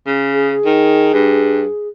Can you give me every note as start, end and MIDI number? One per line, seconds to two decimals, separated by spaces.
0.06 0.55 49
0.33 1.88 68
0.65 1.13 51
1.13 1.65 43